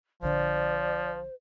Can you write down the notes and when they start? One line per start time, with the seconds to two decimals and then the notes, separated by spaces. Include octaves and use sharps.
0.23 A#1 D3 F3 C5 D5